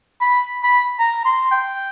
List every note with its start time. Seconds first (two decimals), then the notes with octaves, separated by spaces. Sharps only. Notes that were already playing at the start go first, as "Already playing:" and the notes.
0.21 B5
0.63 B5
0.99 A#5
1.25 C6
1.51 G5